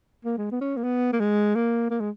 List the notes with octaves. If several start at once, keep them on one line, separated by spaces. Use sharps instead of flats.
A#3
G#3
B3
C#4
A#3
B3
A#3
G#3
A#3
A#3
G#3